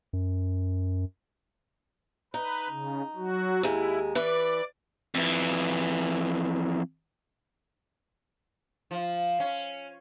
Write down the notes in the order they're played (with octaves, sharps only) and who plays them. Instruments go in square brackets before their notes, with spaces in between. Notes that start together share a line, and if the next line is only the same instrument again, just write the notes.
[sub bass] F#2
[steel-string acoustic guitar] D#4 [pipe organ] B4
[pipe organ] C#3
F#3 F#4
[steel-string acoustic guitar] D#2 G#3 [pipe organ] E4
[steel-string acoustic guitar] E3 B4 [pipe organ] D5
[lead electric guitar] F2 E3
[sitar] F3
C#4